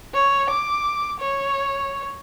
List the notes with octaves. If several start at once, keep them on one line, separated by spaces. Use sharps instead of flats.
C#5
D6
C#5